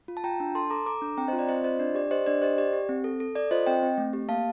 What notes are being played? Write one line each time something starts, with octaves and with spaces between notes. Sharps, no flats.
F4
A5
F4 G5 A#5
D4
A4 A5 C6
A4 A#5 D6
A4 A#5 D6
D4
C4 G5 A#5
C5 D#5
F4
D5
C4 C5 D#5
F4 C5 D#5
D4 D5
G4 D5
G4 C5 D#5
D4 D5
G4 C5 D#5
G4 D5
G4
C4
A4
A4
A4 D5
F4 C5 D#5
C4 D#5 G5
C4
A3
G4
A#3 F5 A5